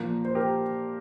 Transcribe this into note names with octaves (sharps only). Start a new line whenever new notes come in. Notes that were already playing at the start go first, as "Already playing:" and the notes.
Already playing: A#2 F3 A#3
C5
G4 A#4